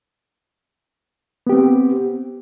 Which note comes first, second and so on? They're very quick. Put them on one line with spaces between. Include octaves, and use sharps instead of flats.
B3 G4 C4